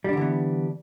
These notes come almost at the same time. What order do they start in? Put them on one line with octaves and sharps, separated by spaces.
G3 D4 D3 E3 B3